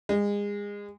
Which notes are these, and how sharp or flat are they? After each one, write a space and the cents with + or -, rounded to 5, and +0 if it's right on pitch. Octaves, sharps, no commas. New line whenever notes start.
G#3 -30